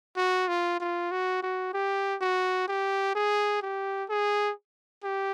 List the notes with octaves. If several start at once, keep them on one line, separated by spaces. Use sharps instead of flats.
F#4
F4
F4
F#4
F#4
G4
F#4
G4
G#4
G4
G#4
G4